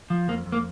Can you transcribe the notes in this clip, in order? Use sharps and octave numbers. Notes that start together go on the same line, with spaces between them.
F3
F2 A#3
F2
A#3